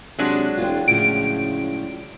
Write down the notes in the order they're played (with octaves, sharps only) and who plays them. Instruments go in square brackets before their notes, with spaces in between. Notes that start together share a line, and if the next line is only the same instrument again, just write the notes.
[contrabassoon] C3 [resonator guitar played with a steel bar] F#3 G#3 D4
[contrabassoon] E1 [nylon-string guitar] C4 F4
[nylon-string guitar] A2 F3 [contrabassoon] C#3 [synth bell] D7